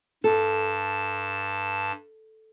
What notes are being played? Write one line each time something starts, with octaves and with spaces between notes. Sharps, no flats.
G2 A4 A5